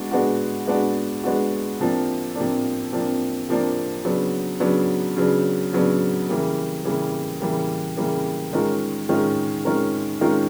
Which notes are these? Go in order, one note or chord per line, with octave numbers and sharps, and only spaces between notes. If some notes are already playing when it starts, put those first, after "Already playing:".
Already playing: G#3 B3 D4 F#4
G#3 B3 D4 F#4
G#3 B3 D4 F#4
G#3 B3 D4 F#4
C3 F3 A#3 D4
C3 F3 A#3 D4
C3 F3 A#3 D4
C3 F3 A#3 D4
C#3 F#3 B3 D4
C#3 F#3 B3 D4
C#3 F#3 B3 D4
C#3 F#3 B3 D4
C#3 E3 G3 A#3
C#3 E3 G3 A#3
C#3 E3 G3 A#3
C#3 E3 G3 A#3
D#3 G#3 C#4 F4 A#4
D#3 G#3 C#4 F4 A#4
D#3 G#3 C#4 F4 A#4
D#3 G#3 C#4 F4 A#4